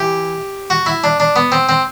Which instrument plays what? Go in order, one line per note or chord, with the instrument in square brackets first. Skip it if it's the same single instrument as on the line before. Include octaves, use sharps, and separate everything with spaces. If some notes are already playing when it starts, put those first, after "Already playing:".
Already playing: [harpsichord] E3 G4
F#4
E4
D4
D4
B3
C4
C4